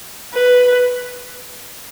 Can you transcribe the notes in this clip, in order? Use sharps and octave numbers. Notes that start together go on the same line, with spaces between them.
B4